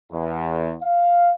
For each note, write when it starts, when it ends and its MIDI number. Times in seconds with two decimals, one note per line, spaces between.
0.11 0.75 40
0.82 1.32 77